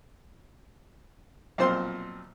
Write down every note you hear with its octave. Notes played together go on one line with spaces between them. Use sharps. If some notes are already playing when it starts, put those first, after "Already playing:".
B1 A#2 F3 C4 C5 C6